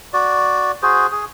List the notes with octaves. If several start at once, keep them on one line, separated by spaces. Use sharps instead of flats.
F#4 D5
F#4 G#4 C5
G#4